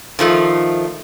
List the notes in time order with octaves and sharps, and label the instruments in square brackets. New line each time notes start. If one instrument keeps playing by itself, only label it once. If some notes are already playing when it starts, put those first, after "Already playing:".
[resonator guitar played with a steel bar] D#3 F3 A3 F4